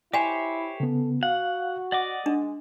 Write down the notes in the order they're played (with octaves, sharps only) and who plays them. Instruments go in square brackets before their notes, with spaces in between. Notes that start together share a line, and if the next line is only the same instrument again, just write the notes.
[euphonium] E4 [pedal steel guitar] G4 C5 C#5 [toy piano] D#5 G#5
[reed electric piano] C#3 B3 [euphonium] A4
[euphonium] F#4 [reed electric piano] F5 [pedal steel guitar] F#5
[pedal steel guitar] D5 D#5 D6 [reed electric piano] F#5
[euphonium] G#3 [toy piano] D4